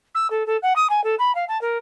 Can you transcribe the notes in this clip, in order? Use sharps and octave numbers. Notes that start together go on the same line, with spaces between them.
E6
A4
A4
F#5
D#6
G#5
A4
B5
F5
A5
A#4